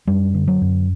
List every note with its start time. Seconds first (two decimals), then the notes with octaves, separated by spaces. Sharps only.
0.07 F#2 G3
0.34 D3
0.48 F#3
0.61 F#2